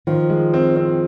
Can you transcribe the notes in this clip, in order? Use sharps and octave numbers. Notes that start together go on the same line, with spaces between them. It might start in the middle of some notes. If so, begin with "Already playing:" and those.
D#3 F3
G#3
C4
C4